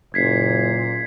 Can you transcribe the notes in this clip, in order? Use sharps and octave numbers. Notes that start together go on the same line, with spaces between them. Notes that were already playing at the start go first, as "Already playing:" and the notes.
F#1 A#2 G#6 B6 C7